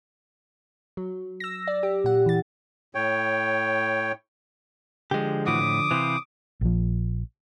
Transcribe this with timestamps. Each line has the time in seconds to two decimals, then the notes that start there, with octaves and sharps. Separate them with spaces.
0.97 F#3
1.40 E6 A#6
1.67 D5
1.83 G4
2.04 A#2 F#5
2.26 E3 A6
2.95 A2 C#5 G5
5.11 D3 F3 G#3 G4
5.46 A2 E3 F#4 D6 D#6
5.61 A2
5.91 C3 E3 B4 C5 F5
6.61 A#1 F3